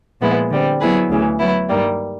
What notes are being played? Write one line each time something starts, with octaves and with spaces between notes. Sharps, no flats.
A#2 F3 G#3 B3 E4
D3 G3 C4
F#3 B3 E4 G#4 B4
D2 C#3 E3
F#3 B3 E4
G2 D#3 G3 A#3